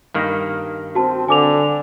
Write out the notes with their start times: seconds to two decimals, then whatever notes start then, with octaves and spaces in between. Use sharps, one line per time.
0.14 G2 D#3 A#3
0.95 C4 F#4 A5
1.28 D3 G#5 D6 F7